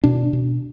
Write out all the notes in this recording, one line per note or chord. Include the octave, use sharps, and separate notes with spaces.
B2 D4
B2